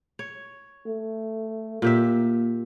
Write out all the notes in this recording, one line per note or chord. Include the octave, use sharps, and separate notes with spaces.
C#5
A3
A#2 A#3 G4 E5